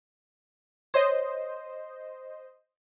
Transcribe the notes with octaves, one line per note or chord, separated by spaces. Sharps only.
C5 C#5 D#5